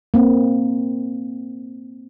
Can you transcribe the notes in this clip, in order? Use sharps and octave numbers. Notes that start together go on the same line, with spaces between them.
A#3 C4